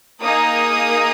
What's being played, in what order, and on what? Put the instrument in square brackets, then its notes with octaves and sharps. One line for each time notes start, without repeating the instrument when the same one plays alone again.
[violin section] A#3 D#4 G#4 D#6